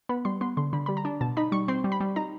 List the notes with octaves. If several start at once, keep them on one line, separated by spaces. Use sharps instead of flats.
B3 B5
G3 C6
B3 C6
D3 C6
D3 B5
G3 B5
A#5
D4
B2 A5
D#4 B5
G3 C#6
C4 C6
G3
B5
G3
D#4 A#5